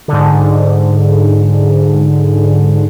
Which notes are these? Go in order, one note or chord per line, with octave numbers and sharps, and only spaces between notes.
G#2 D3